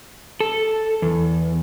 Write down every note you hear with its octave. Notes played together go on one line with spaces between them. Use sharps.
A4
E2